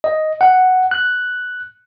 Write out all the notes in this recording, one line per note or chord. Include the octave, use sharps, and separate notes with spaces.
D#5
F#5
F#6